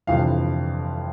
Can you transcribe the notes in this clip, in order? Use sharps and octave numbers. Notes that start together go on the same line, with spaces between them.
G1 F2 C3 E3 G3 F5